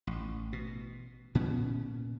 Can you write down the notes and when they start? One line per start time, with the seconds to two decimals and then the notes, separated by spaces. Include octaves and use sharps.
0.07 A1
0.53 B2
1.35 A#2 B3 C#4